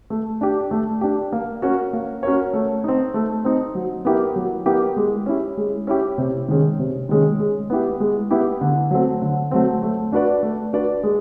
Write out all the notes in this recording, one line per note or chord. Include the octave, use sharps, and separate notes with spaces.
A3
D4 G4
A3
D4 G4
A#3
C#4 F#4 A#4 C#5
A#3
C#4 F#4 A#4 C#5
A3
C4 D#4
A3
C4 D#4
F#3
B3 E4 G4 A#4
F#3
B3 E4 G4 A#4
G#3
C#4 E4 G4
G#3
C#4 E4 G4
C3
D#3 G#3 C#4
C3
D#3 G#3 C#4
G#3
B3 E4 G4
G#3
B3 E4 G4
D3
F#3 A3 C4
D3
F#3 A3 C4
A3
D4 F#4 B4 D5
A3
D4 F#4 B4 D5
G#3